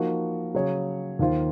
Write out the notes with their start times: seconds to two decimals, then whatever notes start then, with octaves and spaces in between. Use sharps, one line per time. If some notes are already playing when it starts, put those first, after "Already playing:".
Already playing: F3 A#3 D#4 F#4 A#4
0.55 C#3 F#3 C#4 G#4 C#5
1.19 D#2 D#3 A#3 F4 C5